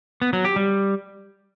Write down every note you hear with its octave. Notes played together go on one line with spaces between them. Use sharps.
B3
F#3
G4
G3